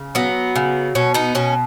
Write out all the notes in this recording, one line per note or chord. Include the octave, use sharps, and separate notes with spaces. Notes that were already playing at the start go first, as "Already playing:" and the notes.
Already playing: C#3
F#3 B3
C#3
B2 C#4
B3 D#4
B2 C#4